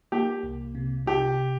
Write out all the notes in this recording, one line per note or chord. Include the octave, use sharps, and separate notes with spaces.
A#3 G4
C2
C3
C3 G4